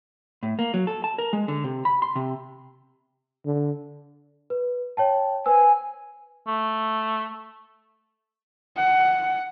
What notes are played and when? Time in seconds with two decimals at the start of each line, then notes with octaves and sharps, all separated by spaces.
0.43 A2
0.59 A#3
0.74 F#3
0.87 A4
1.04 A5
1.18 A#4
1.33 G#3
1.48 D3
1.64 C3
1.85 B5
2.02 C6
2.16 C3
3.46 D3
4.50 B4
4.97 C#5 G5 A5
5.46 B4 C5 G#5 E6
6.47 A3
8.77 F#5